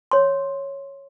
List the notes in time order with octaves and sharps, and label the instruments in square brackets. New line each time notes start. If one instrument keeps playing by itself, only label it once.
[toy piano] C#5 C6